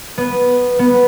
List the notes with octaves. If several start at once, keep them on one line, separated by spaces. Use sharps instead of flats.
B3
B3